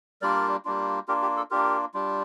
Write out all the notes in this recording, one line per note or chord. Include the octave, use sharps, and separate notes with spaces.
G3 A#3 D4 F4 A#4 D5
G3 A#3 D4 F4
A#3 D4 F4 G4 A#4
G4
A4
A#3 D4 F4 G4 A#4
G3 D4 F4